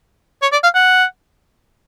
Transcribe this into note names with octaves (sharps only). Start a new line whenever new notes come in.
C#5
D5
F5
F#5